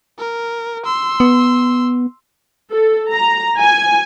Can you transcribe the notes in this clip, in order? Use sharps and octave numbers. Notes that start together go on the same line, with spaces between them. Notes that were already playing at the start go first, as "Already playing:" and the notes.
A#4
C6 E6
B3
A4
A#5
G#5